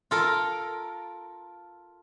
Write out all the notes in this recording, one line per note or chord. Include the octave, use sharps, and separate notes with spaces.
F4 A4 A#4